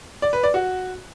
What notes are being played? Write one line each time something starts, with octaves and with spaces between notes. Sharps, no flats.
D5
B4
D5
F#4